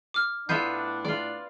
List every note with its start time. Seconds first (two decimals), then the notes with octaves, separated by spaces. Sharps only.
0.14 D6 F6
0.49 A2 B3 D4 F4 E5 G6 C7 D#7
1.05 F4 D5